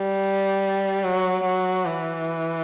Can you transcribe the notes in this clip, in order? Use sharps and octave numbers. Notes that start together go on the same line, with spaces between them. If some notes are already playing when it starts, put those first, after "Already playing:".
Already playing: G3
F#3
F#3
E3